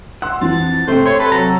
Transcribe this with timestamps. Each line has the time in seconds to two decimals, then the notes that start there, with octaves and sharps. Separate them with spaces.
0.22 F#5 C6 E6
0.41 F2 E3 A6
0.88 C3 A3 C4 C5
1.06 C#5 C6
1.20 A4 B4
1.32 F#3 A#5